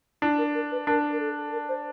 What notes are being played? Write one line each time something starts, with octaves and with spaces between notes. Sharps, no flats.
D4 E4
A#4
A#4
B4
D4 A#4
A#4
A4
A#4
C5